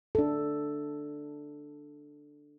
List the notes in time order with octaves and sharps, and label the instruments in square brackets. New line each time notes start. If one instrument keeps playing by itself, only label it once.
[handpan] D4 A4